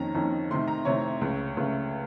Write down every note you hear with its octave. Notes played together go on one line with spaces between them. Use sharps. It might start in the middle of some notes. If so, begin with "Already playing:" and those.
Already playing: F2 D#3 A#3 C#4 A#5
F2 D#3 A#3 C#4
C3 D#3 A3 C6
A#5
C3 D#3 A3 C#5
C#2 C#3 A3
C#2 C#3 A3